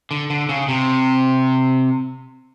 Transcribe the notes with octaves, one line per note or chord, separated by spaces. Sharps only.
D3
D3
C#3
C3